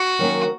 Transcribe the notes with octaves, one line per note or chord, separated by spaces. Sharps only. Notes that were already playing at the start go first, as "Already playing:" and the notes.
Already playing: F#4
D#3 F#3 A#3 C#4